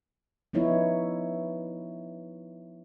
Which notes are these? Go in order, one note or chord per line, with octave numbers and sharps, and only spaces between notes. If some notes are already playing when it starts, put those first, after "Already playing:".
F3 B3 D#4 E4 C#5